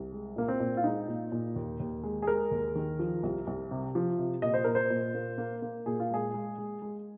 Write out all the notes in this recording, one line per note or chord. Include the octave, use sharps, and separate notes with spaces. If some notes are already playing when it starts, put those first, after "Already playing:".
Already playing: C2
G#3
A#2 A#3
C4
A#2
F4
G#3 D#4
A#2
A#2
D#2
D#2
G#3
G#4
G#3 A#4
D#2
D#3
F3
C2
C2
C3
F3
C3
A#2 D#5
C5
A#2 A#4
C5
A#2
A#3
A#3
A#3
A#2 G#4
F4
G#3 G#4
G#3
G#3
G#3